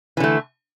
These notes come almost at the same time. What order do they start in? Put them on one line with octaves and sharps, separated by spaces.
E3 D3 A3